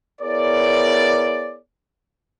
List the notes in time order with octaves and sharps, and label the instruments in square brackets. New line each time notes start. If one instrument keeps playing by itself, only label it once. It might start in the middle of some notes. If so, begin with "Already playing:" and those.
[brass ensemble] B3 E4 G#4 A#4 C#5 D5